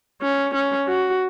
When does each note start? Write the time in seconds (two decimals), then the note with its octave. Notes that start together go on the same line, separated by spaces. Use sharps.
0.22 C#4
0.55 C#4
0.89 F#4